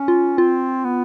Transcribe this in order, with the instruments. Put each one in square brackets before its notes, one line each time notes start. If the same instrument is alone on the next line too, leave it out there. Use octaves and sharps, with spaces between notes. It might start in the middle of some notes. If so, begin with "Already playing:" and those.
Already playing: [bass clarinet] C#4
[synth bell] F4
[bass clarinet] C4 [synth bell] F4
[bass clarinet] B3